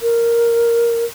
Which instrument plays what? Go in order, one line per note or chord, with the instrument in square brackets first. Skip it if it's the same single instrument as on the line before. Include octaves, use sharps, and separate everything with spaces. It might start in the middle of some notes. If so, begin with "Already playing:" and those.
[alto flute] A#4